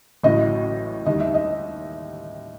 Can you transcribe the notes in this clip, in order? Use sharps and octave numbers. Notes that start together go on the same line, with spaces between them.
A1 A2 F#3 D#5
D#2 D#3 G3 D#5
E5
D#5